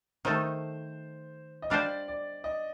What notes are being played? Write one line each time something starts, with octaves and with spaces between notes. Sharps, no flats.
D#3 A3 D#4 A4 C5
D#5
G3 D4 G4 C5 D5 F5
D5
D#5